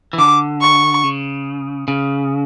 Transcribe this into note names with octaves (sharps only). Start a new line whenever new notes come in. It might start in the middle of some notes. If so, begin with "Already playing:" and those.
E3
D3 D6
C#6
C#3
C#3